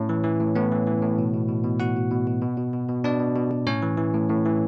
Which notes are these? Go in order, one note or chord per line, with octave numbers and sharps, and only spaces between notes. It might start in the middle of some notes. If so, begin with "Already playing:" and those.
Already playing: A2 C#4 C#5
E3
E3
A2
A2 B3 B4
E3
E3
A2
B2
B2
B2
B2
B2 F#4 F#5
B2
B2
B2
B2
B2
B2
B2
B2 D4 D5
B2
B2
B2
A2 C#4 C#5
E3
E3
A2
A2
E3